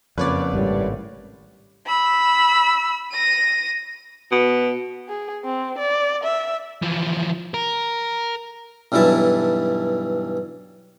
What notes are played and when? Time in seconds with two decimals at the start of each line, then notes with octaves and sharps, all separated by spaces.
0.18 F#1 F2 B4 C#5 D5
0.54 G#1 A2 G3
1.86 B5 E6
3.12 A#6 D#7
4.31 B2
5.09 G#4
5.44 C4
5.78 D5
6.23 E5
6.82 E3 F3
7.54 A#4
8.92 B1 G2 E3 E4 A5